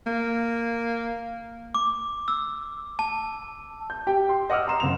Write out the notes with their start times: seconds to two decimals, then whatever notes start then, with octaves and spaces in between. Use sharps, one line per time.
0.07 A#3
1.75 D6
2.28 E6
2.99 A5
3.90 G6
4.07 G4 G5
4.29 C6
4.50 D#5 F#5 D6 E6 F6
4.68 A#5 C6 E7
4.80 F#1 F7